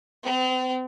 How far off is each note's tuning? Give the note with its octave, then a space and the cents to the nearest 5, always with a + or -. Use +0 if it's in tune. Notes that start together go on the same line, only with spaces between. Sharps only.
C4 -40